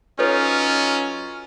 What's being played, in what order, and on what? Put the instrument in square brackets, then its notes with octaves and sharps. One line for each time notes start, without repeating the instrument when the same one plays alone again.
[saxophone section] F#3 D#4 F4 [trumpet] C#4 [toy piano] A4 B4 C#5